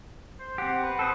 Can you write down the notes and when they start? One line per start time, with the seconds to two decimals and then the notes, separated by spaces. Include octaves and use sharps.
0.39 C5
0.58 C4 G4 F#5
0.83 B4
0.99 A4 C5 D#6